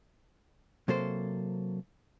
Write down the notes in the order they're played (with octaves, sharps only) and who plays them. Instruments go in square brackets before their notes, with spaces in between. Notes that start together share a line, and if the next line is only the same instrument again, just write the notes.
[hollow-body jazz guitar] C3 F#3 A#3 A4 C5